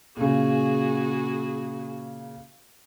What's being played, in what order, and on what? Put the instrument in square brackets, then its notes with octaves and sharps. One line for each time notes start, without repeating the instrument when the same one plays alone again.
[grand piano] A#2 C#3 [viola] F#4 G#4